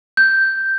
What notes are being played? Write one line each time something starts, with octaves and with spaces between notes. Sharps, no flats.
G6